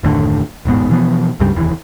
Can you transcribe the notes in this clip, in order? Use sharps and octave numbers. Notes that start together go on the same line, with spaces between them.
F#1 D#2 A2 D3
E1 A1 G#2 B3
B2 E3 F3 B3
C#2 G2 C#3 G3
F1 D#2 E3